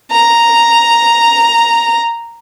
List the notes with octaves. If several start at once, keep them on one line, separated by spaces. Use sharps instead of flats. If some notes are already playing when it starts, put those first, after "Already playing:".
A#5